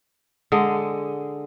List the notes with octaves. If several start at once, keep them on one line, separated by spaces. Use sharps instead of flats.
D3 G#3 D#5